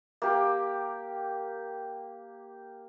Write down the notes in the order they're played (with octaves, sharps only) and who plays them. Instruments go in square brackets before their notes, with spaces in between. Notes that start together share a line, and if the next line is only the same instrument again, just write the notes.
[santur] A#3 G4